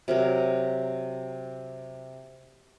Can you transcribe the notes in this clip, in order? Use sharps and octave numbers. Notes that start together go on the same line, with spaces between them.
C3 F#3 A#4